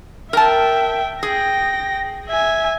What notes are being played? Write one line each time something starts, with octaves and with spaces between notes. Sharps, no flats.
A#4 E5 G5 A5
G#4 G5 A#6
E5 G#5